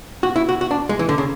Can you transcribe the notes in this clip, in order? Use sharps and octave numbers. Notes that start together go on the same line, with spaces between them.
F#4
E4
F#4
F#4
D4
G#3
E3
D3
C#3